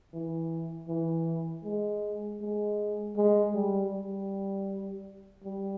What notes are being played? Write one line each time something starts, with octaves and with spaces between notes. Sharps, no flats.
E3
E3
G#3
G#3
G#3
G3
G3
G3